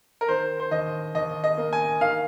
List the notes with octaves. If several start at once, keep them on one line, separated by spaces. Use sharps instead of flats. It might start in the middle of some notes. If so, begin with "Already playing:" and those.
A#4
D#3 C5
C5
D#2 D#5
D#2 D#5
D#5
A#3
G#5
D#3 F5